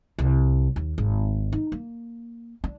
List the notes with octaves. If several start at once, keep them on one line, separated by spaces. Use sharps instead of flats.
C2
D#2
G#1
D#4
A#3
D4